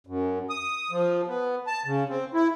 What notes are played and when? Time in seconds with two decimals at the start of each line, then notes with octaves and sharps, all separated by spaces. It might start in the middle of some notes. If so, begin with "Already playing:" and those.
0.07 F#2
0.50 D#6
0.91 F3
1.28 B3
1.67 A5
1.86 C#3
2.09 C4
2.34 E4